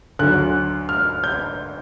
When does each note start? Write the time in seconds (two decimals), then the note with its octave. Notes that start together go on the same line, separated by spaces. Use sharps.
0.19 D2 D3 F#3 F#6
0.89 F6
1.24 G6